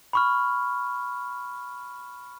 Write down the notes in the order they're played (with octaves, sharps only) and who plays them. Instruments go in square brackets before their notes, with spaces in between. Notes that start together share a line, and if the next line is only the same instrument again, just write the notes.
[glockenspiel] B5 C#6 F6